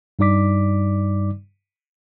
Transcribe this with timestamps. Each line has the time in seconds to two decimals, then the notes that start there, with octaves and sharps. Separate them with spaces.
0.19 G2 G3 D#4 D5 D6 B6